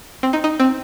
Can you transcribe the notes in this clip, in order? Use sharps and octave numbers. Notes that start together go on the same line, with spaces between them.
C4
D#4
D#4
C4